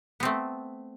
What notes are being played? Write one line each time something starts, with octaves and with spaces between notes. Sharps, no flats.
A3 B3 C4